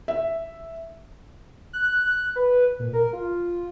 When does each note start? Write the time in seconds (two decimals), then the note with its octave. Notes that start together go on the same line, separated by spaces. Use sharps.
0.08 E5
1.73 F#6
2.36 B4
2.79 A#2
2.93 A#4
3.13 F4